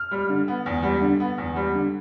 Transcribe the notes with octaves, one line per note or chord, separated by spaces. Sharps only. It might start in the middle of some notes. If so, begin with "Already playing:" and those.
Already playing: F6
G3
D3
B3
E2
G3
D3
B3
E2
G3
D3